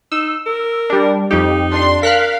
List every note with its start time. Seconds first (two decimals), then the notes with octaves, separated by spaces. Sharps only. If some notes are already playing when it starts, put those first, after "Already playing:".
0.12 D#4 E6
0.46 A#4
0.90 G3 D4
1.31 F2 D#4 G4
1.70 D4 C6
2.03 A#4 F5 F6 F#6 B6